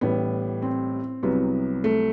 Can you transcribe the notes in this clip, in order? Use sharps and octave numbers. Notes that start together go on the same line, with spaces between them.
A1 A2 G3 B3
C4
C2 C3 F#3 B3
A3